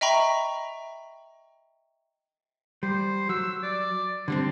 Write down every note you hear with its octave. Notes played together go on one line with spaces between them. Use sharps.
D#5 E5 G5 A#5 B5 C#6
G3 C5
F#3 E6
D5
D3 G3 C4 D4